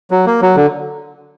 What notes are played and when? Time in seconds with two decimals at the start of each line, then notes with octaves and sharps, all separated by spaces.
0.11 F#3
0.26 A#3
0.42 F#3
0.56 D3